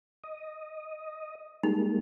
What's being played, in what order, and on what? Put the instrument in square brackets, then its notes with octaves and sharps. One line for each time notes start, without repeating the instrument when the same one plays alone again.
[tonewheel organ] D#5
[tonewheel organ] G3 G#3 A#3 [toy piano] D#4